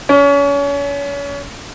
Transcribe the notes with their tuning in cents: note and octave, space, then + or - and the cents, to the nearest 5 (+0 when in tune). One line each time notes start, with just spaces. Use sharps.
C#4 +35